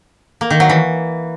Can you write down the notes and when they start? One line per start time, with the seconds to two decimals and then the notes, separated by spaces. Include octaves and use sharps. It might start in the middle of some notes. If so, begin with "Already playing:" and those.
0.41 A#3
0.50 D#3
0.60 F#3
0.69 E3